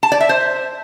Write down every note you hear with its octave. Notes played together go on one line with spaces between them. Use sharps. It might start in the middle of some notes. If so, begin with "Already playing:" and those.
A5
D5
E5
C5